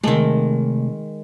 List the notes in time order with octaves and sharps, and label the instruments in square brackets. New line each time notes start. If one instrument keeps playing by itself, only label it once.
[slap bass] C3 A3 [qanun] D#3 G#3